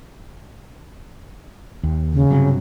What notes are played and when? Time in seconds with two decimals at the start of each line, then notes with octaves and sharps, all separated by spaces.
1.83 D#2
2.13 C#3
2.31 G2 C3 F#3